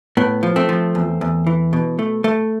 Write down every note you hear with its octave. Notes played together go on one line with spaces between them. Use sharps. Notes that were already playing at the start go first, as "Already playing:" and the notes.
A2 B3
F3
A3 C4
F3
E2
E2
E3
B2
A3
A3